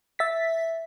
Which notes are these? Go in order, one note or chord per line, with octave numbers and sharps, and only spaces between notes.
E5 A6 B6